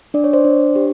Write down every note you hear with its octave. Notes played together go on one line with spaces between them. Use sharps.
D4 D5
C#5
C5 D5
D4
G4